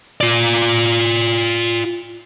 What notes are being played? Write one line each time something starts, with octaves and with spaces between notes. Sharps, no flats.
F4 D5